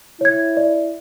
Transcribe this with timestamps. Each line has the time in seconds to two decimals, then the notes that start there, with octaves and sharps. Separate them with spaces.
0.21 E4 C#5 G#6
0.57 D5